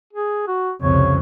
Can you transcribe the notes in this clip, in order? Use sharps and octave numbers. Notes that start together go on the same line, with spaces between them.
G#4
F#4
C2 F2 C#3 C#5